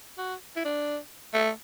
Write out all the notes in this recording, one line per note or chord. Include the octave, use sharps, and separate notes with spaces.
F#4
E4
D4
A3